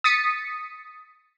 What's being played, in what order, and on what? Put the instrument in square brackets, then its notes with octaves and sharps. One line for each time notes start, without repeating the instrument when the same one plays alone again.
[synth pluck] D#6 A6 B6 C#7 D#7